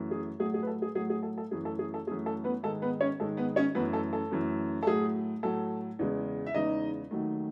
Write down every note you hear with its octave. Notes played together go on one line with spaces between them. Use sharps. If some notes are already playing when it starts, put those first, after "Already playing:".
Already playing: F#2 E3 A3
G#4
A2 F#3 A3 G#4
G#4
B4
A4
G#4
A2 F#3 A3 G#4
G#4
A4
A4
F#2 E3 A3 G#4
A4
G#4
A4
F#2 E3 A3 G#4
A4
B3 B4
G#2 D#3 G#3 A4
B3 B4
C#4 C#5
G#2 D#3 G#3 A4
B3 B4
C#4 C#5
F#2 E3 A3 B3 B4
A4
A4
F#2 E3 A3
A4
A2 F#3 A3 G#4
A2 F#3 A3 A4
E2 C#3 G#3
E5
E2 C#3 G#3 D#4 D#5
D#2 D#3 F#3 A3